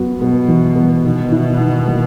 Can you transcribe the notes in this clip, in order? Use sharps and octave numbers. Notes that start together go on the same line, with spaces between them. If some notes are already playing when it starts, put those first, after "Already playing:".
Already playing: F#2 B3 F#4
B2 B3
E3
B3
B2 D#3
E4
D#3
A#3